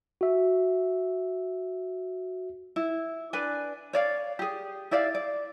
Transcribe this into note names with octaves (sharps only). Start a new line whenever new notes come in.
F#4 E5
E4
D4 B4 D5 G#5
C#5 D5 F5
G4 G#4
E4 G4 D5 F5
D5